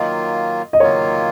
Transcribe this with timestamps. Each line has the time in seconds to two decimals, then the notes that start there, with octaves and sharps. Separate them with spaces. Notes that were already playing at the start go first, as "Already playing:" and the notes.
Already playing: D#3 F#3 A#3 F4 D#5
0.73 D#5
0.80 D#3 F#3 A#3 F4 C#5